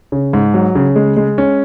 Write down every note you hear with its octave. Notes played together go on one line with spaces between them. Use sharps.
C#3
G#2
F#3
C#3
G#3
G#3
C#4